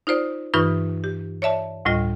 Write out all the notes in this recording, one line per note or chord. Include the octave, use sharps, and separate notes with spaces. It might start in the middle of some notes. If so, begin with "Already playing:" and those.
D#4 F4 C5 D5
G2 E3 D#4 F4 B4 C#6
G4
C#5 D5 E5 A5
D2 A2 G3 F4 D#5